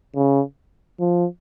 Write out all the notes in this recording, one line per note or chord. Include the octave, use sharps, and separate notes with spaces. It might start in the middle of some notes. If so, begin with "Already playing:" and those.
C#3
F3